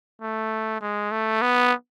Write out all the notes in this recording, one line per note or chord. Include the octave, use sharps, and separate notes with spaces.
A3
G#3
A3
B3